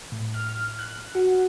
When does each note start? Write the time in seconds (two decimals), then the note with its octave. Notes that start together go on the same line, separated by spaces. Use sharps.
0.12 A2
0.34 F6
0.79 F#6
1.15 F#4